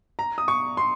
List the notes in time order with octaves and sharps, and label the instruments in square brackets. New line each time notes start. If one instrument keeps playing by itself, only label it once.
[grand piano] A#5
D#6
C#6
C6